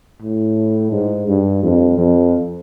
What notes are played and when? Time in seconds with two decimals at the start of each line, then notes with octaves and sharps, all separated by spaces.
0.22 A2
0.92 G#2
1.27 G2
1.63 F2
1.97 F2